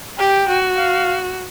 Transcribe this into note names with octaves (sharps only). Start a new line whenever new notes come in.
G4 G5
F#4
F5